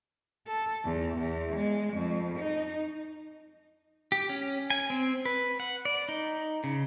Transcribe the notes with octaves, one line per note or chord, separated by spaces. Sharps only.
A4
E2
E2
G#3
F2
D#4
G4
C#4
G#5
C4
B4
F#5
D5
D#4
C#3